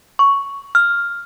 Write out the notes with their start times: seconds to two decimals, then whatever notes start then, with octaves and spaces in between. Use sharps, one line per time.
0.19 C#6
0.75 F6